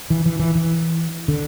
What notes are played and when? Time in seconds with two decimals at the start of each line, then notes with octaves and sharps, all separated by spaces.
0.10 E3
0.26 E3
0.40 E3
0.55 E3
1.28 D3